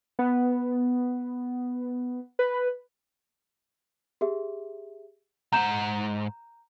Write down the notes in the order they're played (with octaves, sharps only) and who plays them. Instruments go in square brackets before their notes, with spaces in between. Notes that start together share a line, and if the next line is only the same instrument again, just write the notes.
[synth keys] B3
B4
[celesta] G4 G#4 E5
[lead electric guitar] B1 G#2 [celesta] A#5 G6 E7